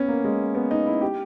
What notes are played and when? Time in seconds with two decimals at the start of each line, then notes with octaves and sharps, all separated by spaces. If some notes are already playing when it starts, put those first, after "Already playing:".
Already playing: B3 C#4
0.09 A#3
0.24 G#3
0.55 B3
0.71 D#4
0.86 E4
1.01 G4